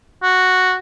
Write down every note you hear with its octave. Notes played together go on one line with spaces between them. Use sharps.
F#4